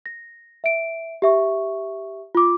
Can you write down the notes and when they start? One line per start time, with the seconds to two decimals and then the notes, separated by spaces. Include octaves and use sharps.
0.06 A#6
0.64 E5 D7
1.22 G4 E5 C#6
2.35 F4 D6